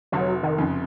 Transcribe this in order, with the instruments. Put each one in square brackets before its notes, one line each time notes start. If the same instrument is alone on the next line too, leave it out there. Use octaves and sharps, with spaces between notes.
[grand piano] F1 [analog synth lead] F#3
[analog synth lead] D#3
[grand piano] F2 C#3